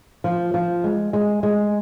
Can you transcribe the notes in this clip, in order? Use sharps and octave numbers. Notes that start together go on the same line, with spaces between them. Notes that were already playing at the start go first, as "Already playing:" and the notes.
F3
F3
G#3
G#3
G#3